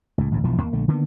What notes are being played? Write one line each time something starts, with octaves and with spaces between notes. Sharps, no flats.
C#2 A2
A1 D2 G#2
E1 B1 E3 F3
D#2 A#3
A#1 D3 A3
D3 D#3 A#3 B3